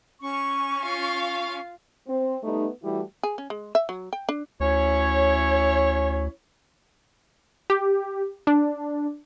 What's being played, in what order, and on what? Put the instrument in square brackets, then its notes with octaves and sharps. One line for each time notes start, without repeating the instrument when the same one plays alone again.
[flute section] C#4 C#6
[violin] F4 F5
[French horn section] C4
G3 A3 B3 D#4
E3 G3 A3 E4 F#4
[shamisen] G#4
C#4
G#3
E5
F#3
G5
D4
[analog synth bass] D2 [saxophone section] C#4 E4 C#5
[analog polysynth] G4
D4